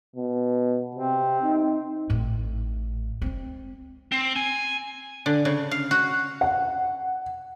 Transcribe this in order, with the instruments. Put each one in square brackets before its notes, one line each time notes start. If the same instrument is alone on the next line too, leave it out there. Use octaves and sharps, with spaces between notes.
[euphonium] B2
[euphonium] C3 [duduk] C4
[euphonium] D#4
[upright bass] A1 A2
G#3 C4
[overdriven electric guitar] C4
G#5
[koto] D3
C#3
F5
F#4
[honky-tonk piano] F#5